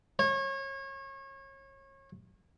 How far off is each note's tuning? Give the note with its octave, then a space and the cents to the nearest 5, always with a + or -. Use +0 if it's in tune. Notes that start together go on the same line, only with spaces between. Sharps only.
C#5 -30